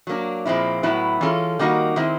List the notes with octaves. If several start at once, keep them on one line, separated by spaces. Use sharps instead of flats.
F#3 A#3 D4
A#2 F3 G#3 C4 E4
A2 F#3 B3 E4
E3 G#3 C#4 F4 A4
D#3 G3 A#3 D#4 F#4
D#3 G#3 C4 E4